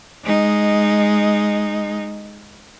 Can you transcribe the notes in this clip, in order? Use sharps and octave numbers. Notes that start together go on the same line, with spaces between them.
G#3 D#4